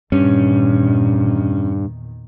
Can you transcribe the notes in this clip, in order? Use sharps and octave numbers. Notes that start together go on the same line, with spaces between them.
E2 G2 A#2 D#3 C#4